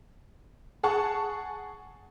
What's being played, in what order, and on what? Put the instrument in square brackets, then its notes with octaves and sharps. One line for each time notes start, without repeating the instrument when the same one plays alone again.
[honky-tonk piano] G#4 F#5 A5 C#6